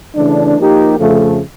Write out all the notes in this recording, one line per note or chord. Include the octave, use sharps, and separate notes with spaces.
C#3 E3 A3 D4
F3 A#3 D#4 G4
F2 C#3 F3 A3